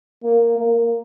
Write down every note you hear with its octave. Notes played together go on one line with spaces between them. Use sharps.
A#3
A#3